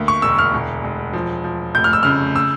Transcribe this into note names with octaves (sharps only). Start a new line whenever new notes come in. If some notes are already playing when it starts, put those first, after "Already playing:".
Already playing: D2 A#3
C#6
E1 E6
F6
E1
E1
F3
F3
F1 G6
F6
E6
C#3 F6
E6